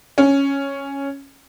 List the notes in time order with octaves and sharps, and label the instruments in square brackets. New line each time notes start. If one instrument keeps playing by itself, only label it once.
[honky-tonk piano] C#4